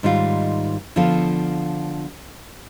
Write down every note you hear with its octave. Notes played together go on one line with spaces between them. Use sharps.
G#2 D#3 G3 D#4 F4
D3 F3 B3 F4 A4